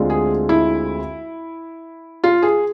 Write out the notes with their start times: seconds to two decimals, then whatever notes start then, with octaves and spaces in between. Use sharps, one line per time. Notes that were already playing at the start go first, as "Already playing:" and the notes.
Already playing: D2 D3 G#3 C4 F4
0.10 G#4
0.49 E4
2.24 F4
2.42 G#4